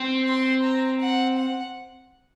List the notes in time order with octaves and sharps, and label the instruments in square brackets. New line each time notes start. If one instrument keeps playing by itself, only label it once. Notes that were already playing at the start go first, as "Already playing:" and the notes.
Already playing: [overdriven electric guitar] C4
[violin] C6
A#5
F#5
F#5